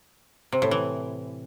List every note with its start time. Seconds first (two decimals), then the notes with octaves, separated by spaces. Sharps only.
0.52 C3
0.62 A2
0.71 E3